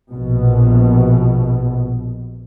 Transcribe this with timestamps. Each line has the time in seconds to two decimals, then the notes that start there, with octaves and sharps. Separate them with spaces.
0.11 A#1 B2